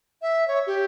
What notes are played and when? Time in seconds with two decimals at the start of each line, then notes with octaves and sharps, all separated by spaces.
0.22 E5
0.48 C#5
0.67 G4